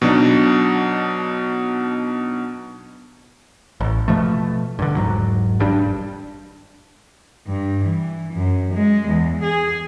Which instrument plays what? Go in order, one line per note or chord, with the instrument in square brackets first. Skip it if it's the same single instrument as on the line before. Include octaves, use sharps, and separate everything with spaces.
[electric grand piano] B2 F#3 D4 D#4
[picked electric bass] A1
B2 F3 A3
G2 D3
E1 F2 G#2 F#3
G#1 G2 G3 D4
[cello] G2
E3
F#2
G#3
E2
G#4